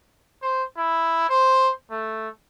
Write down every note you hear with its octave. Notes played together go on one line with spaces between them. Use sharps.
C5
E4
C5
A3